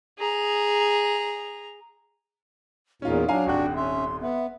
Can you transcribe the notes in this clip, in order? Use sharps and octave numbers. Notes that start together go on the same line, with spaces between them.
G#4 A#5
E2 A#2 C#4 D#4 F4
F#3 D4 F5 G#5 A#5
D#1 G#1 D4 F#4 G5 F#6
C#4 E5 C6
B3 E5